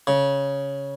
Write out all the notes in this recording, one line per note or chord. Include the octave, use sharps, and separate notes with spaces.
C#3